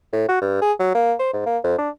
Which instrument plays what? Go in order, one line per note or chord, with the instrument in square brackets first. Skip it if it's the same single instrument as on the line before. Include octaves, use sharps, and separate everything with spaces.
[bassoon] A2
F#4
G2
G#4
F#3
A#3
C5
G#2
A#3
F2
D4